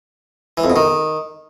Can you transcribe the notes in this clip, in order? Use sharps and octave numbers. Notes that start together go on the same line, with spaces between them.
E3
F2
B2
D#3